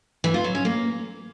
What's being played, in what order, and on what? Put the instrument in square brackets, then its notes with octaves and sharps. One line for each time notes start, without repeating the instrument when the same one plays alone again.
[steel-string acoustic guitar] E3
F4
F#3
C#4
A#3